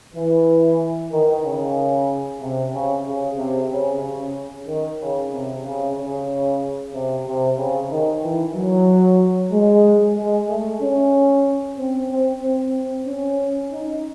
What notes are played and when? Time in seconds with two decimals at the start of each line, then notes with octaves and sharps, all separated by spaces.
0.15 E3
1.12 D#3
1.44 C#3
2.41 C3
2.73 C#3
3.06 C#3
3.38 C3
3.71 C#3
4.02 C#3
4.67 D#3
5.00 C#3
5.32 C3
5.64 C#3
5.97 C#3
6.94 C3
7.26 C3
7.58 C#3
7.90 D#3
8.22 E3
8.55 F#3
9.52 G#3
10.16 G#3
10.49 A3
10.81 C#4
11.78 C4
12.10 C4
12.42 C4
13.06 C#4
13.72 D#4